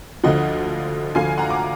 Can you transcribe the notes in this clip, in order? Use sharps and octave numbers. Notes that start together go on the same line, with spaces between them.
D2 D3 F3 D#5 F#5
D2 D3 F3 F5 G#5
F#5 A#5
D6